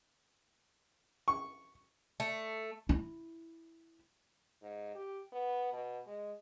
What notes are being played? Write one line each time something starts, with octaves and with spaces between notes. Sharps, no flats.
C#6
A3
E4
G#2
G4
B3
B2
G#3